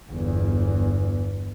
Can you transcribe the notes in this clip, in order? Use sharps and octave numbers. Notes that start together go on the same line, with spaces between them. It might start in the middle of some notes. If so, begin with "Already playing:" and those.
G1 E2